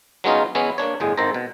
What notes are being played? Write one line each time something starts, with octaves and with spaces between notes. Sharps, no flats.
F#3 G#3 B3 C#4 D#4 F4
E3 G#3 B3 C#4 E4
A#3 D4 C#5
G1 A2 G#3 G#4
G#1 D#3 A4 C5 A#5
B2